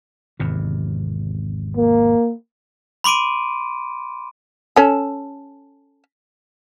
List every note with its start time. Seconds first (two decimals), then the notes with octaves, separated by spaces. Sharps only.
0.40 G#1 E2 C3
1.77 A#3
3.04 B5 C6 D6 D7 D#7
4.76 C#4 A4